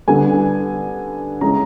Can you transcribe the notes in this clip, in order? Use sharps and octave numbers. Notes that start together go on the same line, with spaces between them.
D3 G3 B3 G#5
C#3 E3 G#3 C#4 A#5